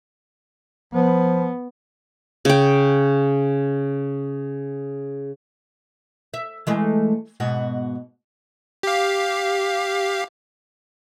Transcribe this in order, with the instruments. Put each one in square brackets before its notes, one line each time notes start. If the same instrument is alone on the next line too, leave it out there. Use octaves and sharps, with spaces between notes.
[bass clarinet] F3 [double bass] B3
[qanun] C#3 G5
[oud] E5
E3 G#3 A3
G#2 B2 F#4
[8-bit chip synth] G4 F5